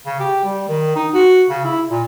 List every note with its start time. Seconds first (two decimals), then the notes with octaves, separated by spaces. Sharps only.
0.06 C#3
0.20 G4
0.44 G3
0.69 D#3
0.96 D#4
1.14 F#4
1.50 C#3
1.65 E4
1.90 A#2